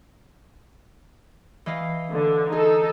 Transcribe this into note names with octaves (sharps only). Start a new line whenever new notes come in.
E3 D#5 F5
D3
D#4 G#4 A4